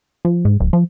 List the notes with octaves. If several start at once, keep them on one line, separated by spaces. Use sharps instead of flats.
F3
G#2
D1
F3